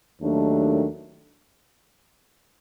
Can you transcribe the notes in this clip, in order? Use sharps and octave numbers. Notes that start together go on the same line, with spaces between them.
D#2 D#3 F#3 A3 D4